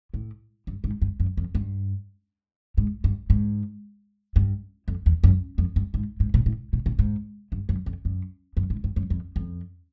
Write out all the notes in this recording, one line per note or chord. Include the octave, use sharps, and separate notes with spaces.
A2
G2
G#2
G2
F#2
F2
G2
G#2
G2
G#2
G2
F2
E2
F#2
F2
G2
G#2
G#2
A#2
A2
A#2
A#2
G#2
G2
F#2
F2
F#2
F#2
G#2
G2
F#2
F2
F2